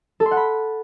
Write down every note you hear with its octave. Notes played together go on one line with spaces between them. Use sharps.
A4
C6
F#5
B5